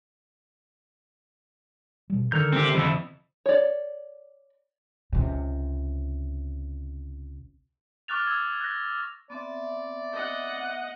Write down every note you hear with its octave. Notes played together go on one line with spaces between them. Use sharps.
B2 G3
D3 D#3 A4 A#4 G6 G#6
C4 G4
F2 C3 D#3 B3 E4
C#5 D5
C#2 C3
C#6 D6 F6 F#6 A6 F7
E6 G#6
F#6 A#6
B3 C4 D5 E5
D#5 F#5